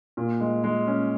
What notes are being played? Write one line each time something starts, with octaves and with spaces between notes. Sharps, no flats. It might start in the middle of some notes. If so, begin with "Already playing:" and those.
A#2
G#3
G#3
C#4